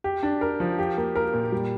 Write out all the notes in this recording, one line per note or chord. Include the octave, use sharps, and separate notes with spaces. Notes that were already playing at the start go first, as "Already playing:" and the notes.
G4
D4
A#4
F3
G4
A#3
A#4
A#2
G3